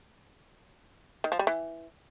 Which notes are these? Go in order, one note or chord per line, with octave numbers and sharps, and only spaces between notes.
D#3
F3
G3
E3